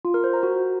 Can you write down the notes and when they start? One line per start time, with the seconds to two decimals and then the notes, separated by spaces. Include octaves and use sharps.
0.05 F4
0.14 A#4
0.24 C5
0.33 A#5
0.43 F#4